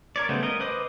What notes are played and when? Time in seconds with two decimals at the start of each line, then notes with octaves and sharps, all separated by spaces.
0.16 A#4 C#5 D5
0.29 C#3 G3 A3 B3 C5
0.43 A#4 D#5
0.60 B4 C5 D#5 D6 D#6